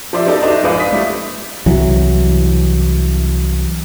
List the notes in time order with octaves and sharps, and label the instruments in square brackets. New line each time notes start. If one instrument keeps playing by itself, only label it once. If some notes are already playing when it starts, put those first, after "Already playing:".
[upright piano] F3 G4 C5 D5 E5
F#3 B3 D#4 G4 A4 D5
D4 D#4 F#4 C5 D#5 E5
A#1 G#3 F4 B4 D5 F5
D#6 B6
G3 A3 D4 E4
[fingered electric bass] C2 E3 F#3